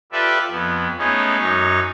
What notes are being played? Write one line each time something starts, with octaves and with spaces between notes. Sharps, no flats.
F4 G4 A4 B4 D5 E5
F2 B3
G#3 A3 B3 C#4 D#4
F#2 D#4 C#5